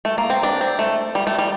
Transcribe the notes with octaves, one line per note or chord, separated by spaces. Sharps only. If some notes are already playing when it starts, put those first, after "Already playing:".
A3
A#3
C4
D4
C4
A3
G3
A3
G3